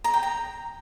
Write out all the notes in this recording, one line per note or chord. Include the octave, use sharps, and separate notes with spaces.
A#5
G5
A#5